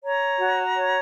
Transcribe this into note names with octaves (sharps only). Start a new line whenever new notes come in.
C#5 A#5
F#4
C#5